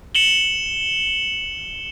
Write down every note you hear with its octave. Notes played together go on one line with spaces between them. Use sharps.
C#7 E7 F#7 G7